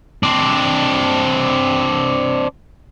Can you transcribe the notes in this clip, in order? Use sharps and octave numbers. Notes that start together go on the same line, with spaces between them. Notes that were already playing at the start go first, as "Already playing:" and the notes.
C4 D4